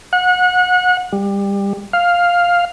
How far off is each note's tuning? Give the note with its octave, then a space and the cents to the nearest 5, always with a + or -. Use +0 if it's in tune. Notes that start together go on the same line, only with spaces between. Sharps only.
F#5 -30
G3 +25
F5 +5